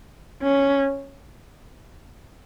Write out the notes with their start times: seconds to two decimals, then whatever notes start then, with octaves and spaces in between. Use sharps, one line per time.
0.42 C#4